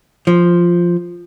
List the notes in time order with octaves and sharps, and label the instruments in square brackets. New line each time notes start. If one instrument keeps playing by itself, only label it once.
[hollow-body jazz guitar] F3